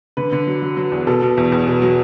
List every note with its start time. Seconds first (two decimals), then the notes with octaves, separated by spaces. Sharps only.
0.17 D3 B4
0.32 D3
0.47 F#3
0.62 F#3
0.77 F#3
0.92 E2
1.07 B2 A4
1.22 B2
1.37 E2
1.52 E2
1.67 B2
1.82 F#3